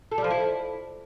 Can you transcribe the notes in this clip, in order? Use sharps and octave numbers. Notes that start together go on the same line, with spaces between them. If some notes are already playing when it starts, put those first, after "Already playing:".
A4
G3
F3
E4